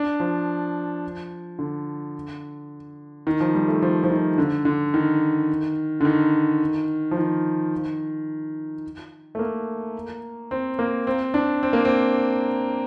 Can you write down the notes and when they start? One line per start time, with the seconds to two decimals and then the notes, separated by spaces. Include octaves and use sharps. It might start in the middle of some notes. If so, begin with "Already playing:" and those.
Already playing: D4
0.20 F3
1.59 D3
3.27 D#3
3.41 F3
3.55 G3
3.68 A3
3.82 F3
4.04 F3
4.10 D#3
4.38 D3
4.65 D3
4.94 D#3
6.01 D3
6.05 D#3
7.11 F3
7.17 D#3
9.35 A3
9.39 A#3
10.51 C4
10.79 A#3
11.07 C4
11.34 D4
11.63 C4
11.73 A#3
11.85 C4